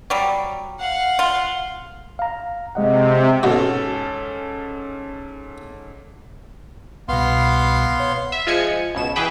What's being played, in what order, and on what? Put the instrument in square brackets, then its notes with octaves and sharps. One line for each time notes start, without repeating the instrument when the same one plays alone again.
[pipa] F#3 G3
[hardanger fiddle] F5 F#5
[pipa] F4
[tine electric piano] F5 A#5
[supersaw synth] C3 [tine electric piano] G#3 D#5 F#5
[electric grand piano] G#2 C#4 A4 [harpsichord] B2 F#4
[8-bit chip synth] C2 B2 [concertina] B3 F5 C6
[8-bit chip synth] C#5
[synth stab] E5
F3 G#3 G#5 C#7
C#2 B2 E7
E3 G#4 B4 G5